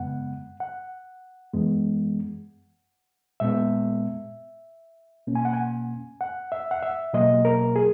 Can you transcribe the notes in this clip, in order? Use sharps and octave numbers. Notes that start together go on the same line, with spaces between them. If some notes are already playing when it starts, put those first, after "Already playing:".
Already playing: F#2 C#3 G#3 B3 F#5
F#5
F#2 E3 G#3 B3
A#2 G#3 B3 E5
B2 A#3 C#4
G#5
F#5
G#5
F#5
E5
F#5
E5
B2 F#3 A#3 D#5
A#4
G#4